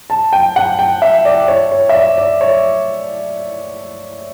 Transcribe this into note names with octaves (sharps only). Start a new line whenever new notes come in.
A5
G5
F#5
G5
E5
D5
C#5
C#5
E5
D5
D5
C#5